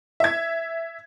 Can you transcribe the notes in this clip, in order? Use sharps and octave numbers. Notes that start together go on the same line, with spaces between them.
E5 G#6